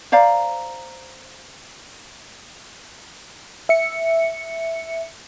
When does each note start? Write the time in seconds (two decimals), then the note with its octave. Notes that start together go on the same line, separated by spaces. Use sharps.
0.12 C5 D5 F5 A#5
3.69 E5 C#7